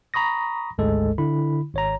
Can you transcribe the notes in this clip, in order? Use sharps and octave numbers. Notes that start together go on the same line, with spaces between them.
A#5 B5 C#6 D#6 A#6
G#1 D2 G#2 G#3 A4
D3 E4 B5
G#1 C#5 A#5